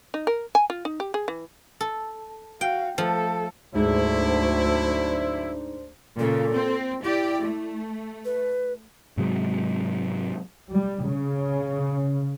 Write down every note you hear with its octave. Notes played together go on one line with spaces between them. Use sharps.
D#4
A#4
G#5
F4
D#4
G4
G#4
E3
A4
F#4 F5 G5
F3 A3 A4
D2 G#2 D3 F#3 D4 E4 C5
A#2 C#3 A4
C4
E4 G4 D5
A3
B4
G#2 C3 F#3 G#3
G3
C#3